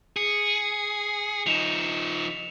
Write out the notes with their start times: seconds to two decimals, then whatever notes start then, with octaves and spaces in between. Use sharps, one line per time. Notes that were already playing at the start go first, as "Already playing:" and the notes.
0.16 G#4 C#7
1.46 F3 D#4 E7 F7